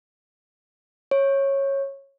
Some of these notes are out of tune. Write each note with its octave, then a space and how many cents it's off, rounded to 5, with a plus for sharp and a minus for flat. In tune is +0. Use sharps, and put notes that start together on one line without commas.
C#5 -15